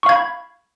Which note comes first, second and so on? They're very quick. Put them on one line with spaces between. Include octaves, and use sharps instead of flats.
C#6 F5 G#6 B5